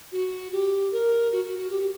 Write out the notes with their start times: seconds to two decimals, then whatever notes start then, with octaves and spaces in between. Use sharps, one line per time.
0.12 F#4
0.52 G4
0.92 A#4
1.32 F#4
1.45 F#4
1.59 F#4
1.70 G4
1.80 G4